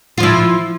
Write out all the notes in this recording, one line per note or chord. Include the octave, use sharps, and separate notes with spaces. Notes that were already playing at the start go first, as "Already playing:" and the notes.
F3 E4 F4